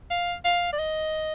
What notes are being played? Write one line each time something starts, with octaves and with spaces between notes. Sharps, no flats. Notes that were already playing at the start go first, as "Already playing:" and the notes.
F5
F5
D5
D#5